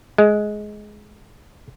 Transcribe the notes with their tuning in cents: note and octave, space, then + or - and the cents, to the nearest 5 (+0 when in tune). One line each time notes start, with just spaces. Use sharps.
G#3 +15